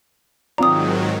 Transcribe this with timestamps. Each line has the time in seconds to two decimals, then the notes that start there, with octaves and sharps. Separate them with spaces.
0.58 G#2 D#3 F#3 C4 F4 D5 A#5 D#6